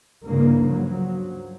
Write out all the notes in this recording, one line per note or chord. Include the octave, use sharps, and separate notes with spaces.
G2 C#3 E3 A#3
F3 F#3